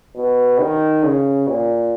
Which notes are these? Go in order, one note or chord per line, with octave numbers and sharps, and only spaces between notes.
B2
D#3
C#3
A#2